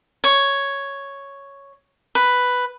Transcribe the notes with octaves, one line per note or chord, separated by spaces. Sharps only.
C#5
B4